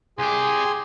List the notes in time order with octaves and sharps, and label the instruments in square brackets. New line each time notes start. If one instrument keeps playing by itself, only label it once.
[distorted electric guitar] C2 G4 [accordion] G#4 G#5 C6